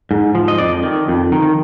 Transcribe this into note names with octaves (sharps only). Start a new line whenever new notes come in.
G#2
F3
D#5
F2 D5
D#3
F2
D#3